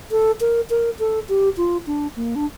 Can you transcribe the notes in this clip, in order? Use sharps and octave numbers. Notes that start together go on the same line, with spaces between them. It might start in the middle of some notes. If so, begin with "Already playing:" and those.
A4
A#4
A#4
A4
G4
F4
D4
A#3
D4